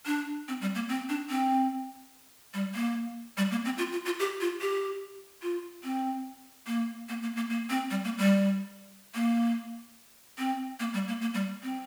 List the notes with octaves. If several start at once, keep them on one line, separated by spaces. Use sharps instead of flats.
D4
C4
G3
A#3
C4
D4
C4
G3
A#3
G3
A#3
C4
F4
F4
F4
G4
F4
G4
F4
C4
A#3
A#3
A#3
A#3
A#3
C4
G3
A#3
G3
A#3
C4
A#3
G3
A#3
A#3
G3
C4